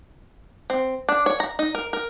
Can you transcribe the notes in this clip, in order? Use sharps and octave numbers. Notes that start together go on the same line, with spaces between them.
C4
D4
C#5
A#5
D#4
A#4
A#4